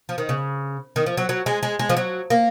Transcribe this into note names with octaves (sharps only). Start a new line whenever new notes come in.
F3
D#3
C#3
D#3
F3
F#3
F#3
G#3
G#3
G#3
F3
F#3
A#3